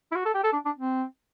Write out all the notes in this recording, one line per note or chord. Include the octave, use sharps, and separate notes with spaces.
E4
F#4
A4
G4
A4
D4
D4
C4